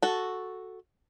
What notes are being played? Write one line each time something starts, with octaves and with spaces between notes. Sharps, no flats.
F#4 A4